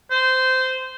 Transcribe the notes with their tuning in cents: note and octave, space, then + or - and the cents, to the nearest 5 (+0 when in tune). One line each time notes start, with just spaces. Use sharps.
C5 -15